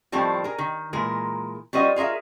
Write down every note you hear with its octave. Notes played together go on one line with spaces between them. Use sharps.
A2 D#3 F3 G3 C4
G#4 A#4
D#3
A#2 E3 G#3 A#4
G3 C#4 F4 F#4 C5 D#5
F4 G#4 A#4 E5 F5